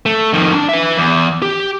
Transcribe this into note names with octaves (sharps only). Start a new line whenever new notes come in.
A3
F2 D#3
D4
B4 E5
E2
G4